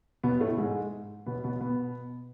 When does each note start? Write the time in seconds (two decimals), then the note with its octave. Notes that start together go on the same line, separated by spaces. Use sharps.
0.23 B2 B3
0.40 A2 A3
0.57 G#2 G#3
1.26 B2 B3
1.44 B2 B3
1.61 B2 B3